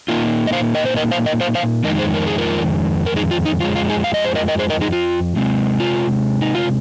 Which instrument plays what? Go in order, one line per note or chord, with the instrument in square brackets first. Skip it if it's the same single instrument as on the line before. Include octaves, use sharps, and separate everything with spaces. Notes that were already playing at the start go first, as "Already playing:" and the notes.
[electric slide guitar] A#2 A#3 D#4 F4
D#5
C5 F5
A#4 D#5
C5
A#4 D#5
C5 F5
A#4 D#5
C5 F5
C5 F5
F2 D#3 G#3 D#4 A#4 D#5
G#4 C5
A#4
G#4
F4 A#4
A#4
D#4 G#4
F4
D#4
F2 F3 G#3 F4
F4
D#4 G#4
F5
D#5
C5
A#4 D#5
A#4 D#5
G#4 C5
A#4 D#5
D#4 G#4
F4
C3 G#3 C4
F4
D#4
F4